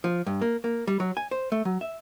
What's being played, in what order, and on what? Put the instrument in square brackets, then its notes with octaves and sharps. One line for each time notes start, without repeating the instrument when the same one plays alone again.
[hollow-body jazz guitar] F3
G2
A#3
A#3
G3
F#3
G#5
C5
A3
F#3
E5